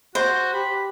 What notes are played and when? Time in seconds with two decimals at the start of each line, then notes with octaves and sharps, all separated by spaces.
0.15 F#4 C5
0.53 G4 B5